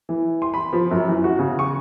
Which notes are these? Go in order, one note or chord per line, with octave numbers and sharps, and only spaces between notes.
E3
C6
B5
F3
F#2
E3
F#4
C#3
C#6